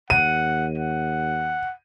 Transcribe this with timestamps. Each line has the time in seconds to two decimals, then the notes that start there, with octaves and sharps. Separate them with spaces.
0.10 D#2 F#5 D#7
0.78 F#5